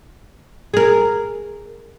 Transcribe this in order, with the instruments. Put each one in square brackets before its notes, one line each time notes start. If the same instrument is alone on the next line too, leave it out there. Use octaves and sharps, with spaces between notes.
[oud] G#4 A#4